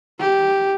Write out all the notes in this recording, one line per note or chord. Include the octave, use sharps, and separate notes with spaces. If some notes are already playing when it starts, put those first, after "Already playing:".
G4